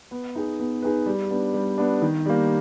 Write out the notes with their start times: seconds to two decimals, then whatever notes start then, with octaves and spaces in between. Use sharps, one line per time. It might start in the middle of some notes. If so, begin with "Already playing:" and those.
0.11 B3
0.35 D#4 G#4 B4
0.59 B3
0.82 D#4 G#4 B4
1.06 G3
1.30 B3 D4
1.54 G3
1.78 B3 D4
2.02 D#3
2.26 G3 A#3